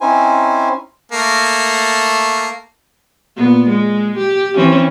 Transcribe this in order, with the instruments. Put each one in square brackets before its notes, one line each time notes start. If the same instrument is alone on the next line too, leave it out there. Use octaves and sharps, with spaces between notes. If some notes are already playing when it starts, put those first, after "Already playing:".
[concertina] C4 C#4 D#4 E4 C5 G#5
[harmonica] A3 A#3 A5
[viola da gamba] A#2 B3
G#3
G4
E3 C4 C#4